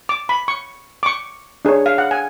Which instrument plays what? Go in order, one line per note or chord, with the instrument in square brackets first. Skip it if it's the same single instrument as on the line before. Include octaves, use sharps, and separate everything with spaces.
[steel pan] D6
B5
C#6
D6
C#6
D4 G#4 C#5
F5
F#5
G#5